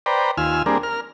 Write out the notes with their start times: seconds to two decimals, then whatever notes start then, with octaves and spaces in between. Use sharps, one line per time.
0.06 B4 C5 D5 G5 A#5
0.38 D#2 F4 G#5 E6 F6
0.66 G3 A#3 C4 D4 G#4 A#4
0.83 A#4 F6